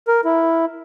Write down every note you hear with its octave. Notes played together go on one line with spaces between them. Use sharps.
A#4
E4